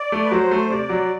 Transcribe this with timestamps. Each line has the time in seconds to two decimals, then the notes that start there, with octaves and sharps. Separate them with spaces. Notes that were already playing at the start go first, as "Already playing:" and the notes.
Already playing: D5
0.12 A3
0.25 B4
0.31 F#3 C5
0.51 A3
0.70 C3 D5
0.89 F#3